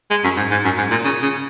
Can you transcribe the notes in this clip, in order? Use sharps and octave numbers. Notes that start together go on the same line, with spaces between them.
G#3
F#2
G#2
G#2
F#2
G#2
A#2
C#3
C#3